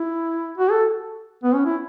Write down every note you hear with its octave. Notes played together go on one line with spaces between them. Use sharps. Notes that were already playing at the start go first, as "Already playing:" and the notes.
Already playing: E4
F#4
A4
B3
C#4
E4